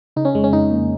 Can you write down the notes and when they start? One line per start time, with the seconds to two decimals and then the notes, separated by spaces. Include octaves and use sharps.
0.16 C#3 D#4
0.25 C#4
0.34 F2 G#3
0.44 C#4
0.53 F2 D#4
0.71 A#3